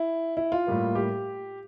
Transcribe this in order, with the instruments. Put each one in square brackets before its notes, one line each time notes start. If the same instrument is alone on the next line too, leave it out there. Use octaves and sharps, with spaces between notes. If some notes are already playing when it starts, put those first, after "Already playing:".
Already playing: [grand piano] E4
E4
F4
A2 G3 A#3
G4